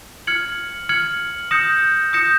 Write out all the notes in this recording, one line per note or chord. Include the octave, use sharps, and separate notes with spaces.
F6 G#6 C#7 F#7
F6 G#6 C#7 F#7
D#6 G6 A#6 C#7 E7
D#6 G6 A#6 C#7 E7